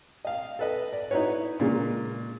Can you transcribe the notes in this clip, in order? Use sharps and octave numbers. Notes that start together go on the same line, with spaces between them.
D#5 F5
A4 B4 D#5
D5
D#4 E4 F#4 B4 C#5
A#2 C#3 G#3 A#3